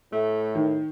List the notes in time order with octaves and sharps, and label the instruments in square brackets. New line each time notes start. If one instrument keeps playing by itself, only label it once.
[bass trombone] A2 [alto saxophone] A3
[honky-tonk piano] D#3